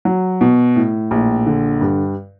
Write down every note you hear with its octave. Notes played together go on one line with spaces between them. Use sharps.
F#3
B2
A2
A#1
D3
G2